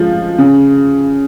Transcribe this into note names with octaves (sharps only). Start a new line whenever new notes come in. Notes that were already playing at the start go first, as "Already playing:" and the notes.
Already playing: F3 G#3
C#3